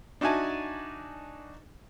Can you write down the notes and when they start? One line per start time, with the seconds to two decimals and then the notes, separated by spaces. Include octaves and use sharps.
0.21 D4 D#4 F#4 E5 G#5 A5